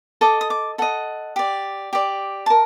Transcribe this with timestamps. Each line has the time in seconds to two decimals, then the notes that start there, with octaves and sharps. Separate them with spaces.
0.21 A4 D#5 D6
0.41 D#6
0.50 D6
0.78 A4 D#5 F#5
1.36 G4 D5
1.93 G4 D5
2.46 A5
2.50 A#4